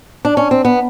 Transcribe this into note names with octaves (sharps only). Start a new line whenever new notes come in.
D4
C#4
C4
B3